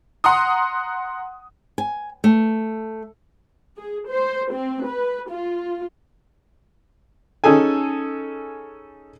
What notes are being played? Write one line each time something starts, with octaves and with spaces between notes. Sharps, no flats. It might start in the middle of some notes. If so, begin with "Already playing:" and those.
F#5 A#5 C6 D#6
G#5
A3
G#4
C5
C4
B4
F4
C#4 D#4 G#4 A4 G#5